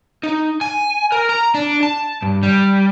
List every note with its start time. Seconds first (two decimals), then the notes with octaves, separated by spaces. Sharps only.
0.23 D#4
0.61 G#5
1.12 A#4
1.29 A#5
1.54 D4
1.83 A5
2.22 G2
2.43 G3